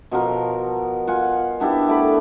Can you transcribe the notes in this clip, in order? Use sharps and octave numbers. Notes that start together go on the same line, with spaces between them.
B2 F3 F#4 A#4
F4 F#5 G#5
B3 D4 E4 G4
A3 D5 B5